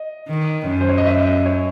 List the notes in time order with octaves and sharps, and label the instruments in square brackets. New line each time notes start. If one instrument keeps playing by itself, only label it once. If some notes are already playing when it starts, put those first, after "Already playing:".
Already playing: [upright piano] D#5
[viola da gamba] D#3
F#2
[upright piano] C5
C#5
D#5
E5
D#5
C#5